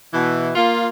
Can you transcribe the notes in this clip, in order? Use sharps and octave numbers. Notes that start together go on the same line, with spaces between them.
B2 E3
A#3 F4